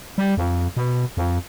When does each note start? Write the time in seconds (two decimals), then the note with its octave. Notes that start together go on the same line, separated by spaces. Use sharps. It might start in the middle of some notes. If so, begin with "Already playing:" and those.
0.18 G3
0.37 F2
0.77 B2
1.17 F2